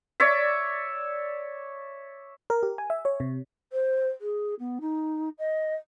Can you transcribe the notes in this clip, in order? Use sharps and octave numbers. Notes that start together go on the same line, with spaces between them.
C#5 D5 E5
A#4
G4
G#5
E5
C#5
C3
C5
G#4
B3
D#4
D#5